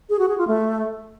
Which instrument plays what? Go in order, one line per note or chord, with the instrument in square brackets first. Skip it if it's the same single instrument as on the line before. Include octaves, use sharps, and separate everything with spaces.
[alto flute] G#4
F#4
G#4
F4
A3